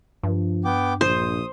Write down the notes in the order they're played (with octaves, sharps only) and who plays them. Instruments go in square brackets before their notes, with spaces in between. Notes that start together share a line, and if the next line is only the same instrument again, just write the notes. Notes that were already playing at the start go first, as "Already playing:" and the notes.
[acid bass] G2 [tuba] F3
[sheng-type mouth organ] B3 G5 D6
[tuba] A#1 [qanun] C5 [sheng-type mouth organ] D#6